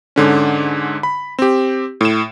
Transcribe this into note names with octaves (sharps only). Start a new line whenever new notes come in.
G#2 D3 C#4
B5
C4 G4
A2 E7